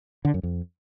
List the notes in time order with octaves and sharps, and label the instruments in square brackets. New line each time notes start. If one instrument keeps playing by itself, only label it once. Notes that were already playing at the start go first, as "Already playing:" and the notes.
[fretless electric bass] D3
F#2
F2